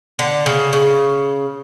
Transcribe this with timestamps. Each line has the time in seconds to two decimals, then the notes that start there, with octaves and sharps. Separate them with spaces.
0.19 D3
0.46 C#3
0.73 C#3